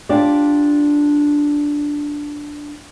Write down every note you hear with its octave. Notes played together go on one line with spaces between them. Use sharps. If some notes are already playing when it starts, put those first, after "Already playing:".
D4 F4 G4 D5